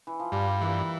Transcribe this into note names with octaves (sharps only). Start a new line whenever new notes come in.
E3
F3
G2 G3
E3 G3 A#3